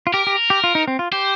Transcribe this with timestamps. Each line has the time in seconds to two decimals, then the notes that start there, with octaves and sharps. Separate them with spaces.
0.07 F4
0.14 G4 A#4
0.27 G4
0.50 G4
0.64 F4
0.75 D#4
0.88 C4
0.99 F4
1.12 G4 C5